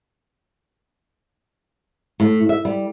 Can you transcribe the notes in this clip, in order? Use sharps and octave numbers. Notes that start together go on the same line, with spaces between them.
A2
E5
G3